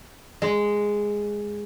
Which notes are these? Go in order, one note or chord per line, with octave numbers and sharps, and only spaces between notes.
G#3